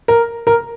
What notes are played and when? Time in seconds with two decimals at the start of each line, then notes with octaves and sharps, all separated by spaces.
0.08 A#4
0.47 A#4